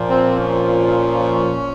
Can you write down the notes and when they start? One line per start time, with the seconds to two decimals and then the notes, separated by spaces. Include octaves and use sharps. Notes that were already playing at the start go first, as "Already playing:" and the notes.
Already playing: A#2 F3
0.10 C4
0.39 C#4